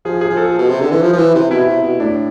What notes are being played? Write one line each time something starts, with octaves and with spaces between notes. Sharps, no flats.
F3 G#4
G#4
F3
A4
B2
C3
D3
E3
F3
F3
E3
C3
B2 E4
C3
B2
A2 D4